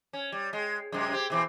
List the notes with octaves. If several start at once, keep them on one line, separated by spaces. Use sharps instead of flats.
C#4
G3
G#3
F#2 C3 G#3
C4 G4
B2 E3 C4